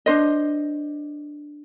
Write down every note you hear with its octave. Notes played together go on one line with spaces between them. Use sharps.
D4 C5 D#5